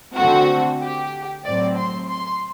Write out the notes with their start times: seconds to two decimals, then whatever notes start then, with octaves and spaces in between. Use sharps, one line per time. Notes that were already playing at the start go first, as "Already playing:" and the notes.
0.17 D3 A3 C4 F#4
0.81 G4
1.46 A2 F#3 C4 D5
1.79 C6
2.12 C6